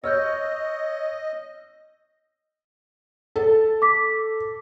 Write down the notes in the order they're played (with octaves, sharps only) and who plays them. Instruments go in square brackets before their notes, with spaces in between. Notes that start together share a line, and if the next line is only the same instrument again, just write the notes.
[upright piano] C#5 [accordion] D#5 [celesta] E6 F6 G6
[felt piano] A4
[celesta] D6 B6